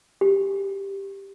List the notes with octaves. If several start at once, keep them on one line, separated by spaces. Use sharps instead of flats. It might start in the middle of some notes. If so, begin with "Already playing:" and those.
G4